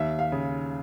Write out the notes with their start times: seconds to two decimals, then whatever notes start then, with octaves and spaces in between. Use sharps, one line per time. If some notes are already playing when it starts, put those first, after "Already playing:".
Already playing: D#2 E5
0.19 F5
0.32 C#3